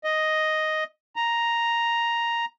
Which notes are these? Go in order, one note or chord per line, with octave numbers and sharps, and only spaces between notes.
D#5
A#5